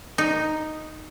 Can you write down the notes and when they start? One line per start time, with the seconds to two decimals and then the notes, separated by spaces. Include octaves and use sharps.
0.18 D#4